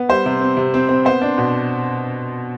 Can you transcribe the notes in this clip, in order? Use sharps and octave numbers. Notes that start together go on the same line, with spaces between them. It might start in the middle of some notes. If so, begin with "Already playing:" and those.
Already playing: B3
G3 C5
C3
C4
C3
C4
C4
B3 C5
D4
B2